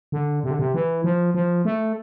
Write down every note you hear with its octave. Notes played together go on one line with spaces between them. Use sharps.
D3
C3
D3
C3
E3
F3
F3
A3